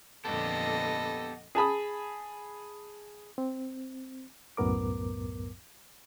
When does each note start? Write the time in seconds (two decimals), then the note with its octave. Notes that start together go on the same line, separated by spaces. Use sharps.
0.25 F2 A#2 D3 B3 G4 A4 D#5
1.55 G#4 A5 B5 D#6
3.38 C4
4.57 C2 F#2 A2 B3 A#4 D6